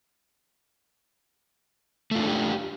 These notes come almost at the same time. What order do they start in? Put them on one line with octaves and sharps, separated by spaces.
A3 F4 D4 A4 G4